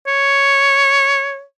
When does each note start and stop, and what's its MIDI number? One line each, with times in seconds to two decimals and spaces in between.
0.07 1.43 73